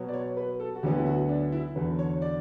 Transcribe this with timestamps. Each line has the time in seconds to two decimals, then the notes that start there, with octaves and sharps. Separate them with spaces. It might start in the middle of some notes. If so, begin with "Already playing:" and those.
Already playing: B2 F#3 B3
0.09 D5
0.14 C#5
0.37 B4
0.60 A4
0.75 F#4
0.83 D2 D3 F#3 B3 G4
0.98 E4
1.06 F#4
1.29 D4
1.52 E4
1.75 E2 D3 F#3 B4
1.99 C#5
2.22 D5